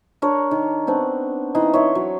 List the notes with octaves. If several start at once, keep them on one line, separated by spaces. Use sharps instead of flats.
D4 A#4 C#5
D#3
B3 C4 D4
E3 D#4 C6
C#5 E5 C6
F#3